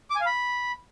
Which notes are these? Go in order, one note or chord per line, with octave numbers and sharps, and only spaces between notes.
D6
G#5
F5
B5